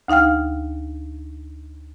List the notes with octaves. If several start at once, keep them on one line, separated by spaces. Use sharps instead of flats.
D2 D#4 F5 G5 F6